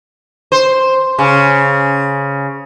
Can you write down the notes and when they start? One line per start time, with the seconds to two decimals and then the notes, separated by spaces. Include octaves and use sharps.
0.52 C5
1.19 C#3